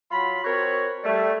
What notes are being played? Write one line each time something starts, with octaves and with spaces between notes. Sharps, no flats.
F#3 F4 B5
C4 F#4 A#4 C#5
G3 A3